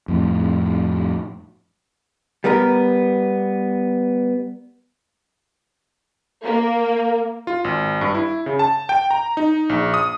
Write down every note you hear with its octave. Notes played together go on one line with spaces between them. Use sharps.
F2 A2
G3 B3 A#4 A#5
A#3
F4
G#1
G2
E4
C#3
A5
G5
A#5
D#4
A#1
D#6